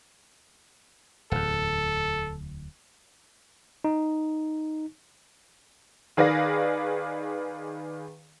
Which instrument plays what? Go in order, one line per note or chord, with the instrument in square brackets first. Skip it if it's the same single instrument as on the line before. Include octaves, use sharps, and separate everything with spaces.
[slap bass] D1 E2 [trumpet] A4
[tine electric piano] D#4
[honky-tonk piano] D#3 G#4 B4 D5 F5 A#6